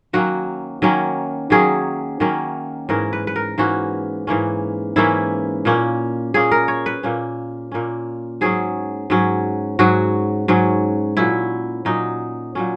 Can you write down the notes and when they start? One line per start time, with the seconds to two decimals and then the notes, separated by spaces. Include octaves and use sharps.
0.13 D#3 F#3 A#3 C#4 F#4
0.82 D#3 F#3 A#3 C#4
1.50 D#3 F#3 A#3 C#4 G#4
2.20 D#3 F#3 A#3 C#4
2.89 G#2 E3 A#3 C#4 A#4
3.13 B4
3.27 B4
3.36 A#4
3.58 G#2 E3 A#3 C#4 F#4
4.27 G#2 E3 A#3 C#4
4.96 G#2 E3 A#3 C#4 E4
5.65 A#2 A#3 C#4
6.34 A#2 A#3 C#4 G#4
6.51 A#4
6.68 C#5
6.86 B4
7.03 A#2 A#3 C#4
7.72 A#2 A#3 C#4
8.41 G#2 F#3 C#4 G#4
9.10 G#2 F#3 C#4
9.79 G#2 F#3 C#4 F#4
10.48 G#2 F#3 C#4
11.17 A#2 F#3 C#4 E4
11.85 A#2 F#3 C#4 D#4
12.55 A#2 F#3 C#4